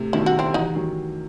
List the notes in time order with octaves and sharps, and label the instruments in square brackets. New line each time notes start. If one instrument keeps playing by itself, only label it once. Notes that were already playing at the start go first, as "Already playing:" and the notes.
Already playing: [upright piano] A2 C3
[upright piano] B2 D#3 [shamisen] E4
[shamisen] F#4
C4 E4
[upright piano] C3 E3 [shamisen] D#4 F#4
[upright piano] D#3 F#3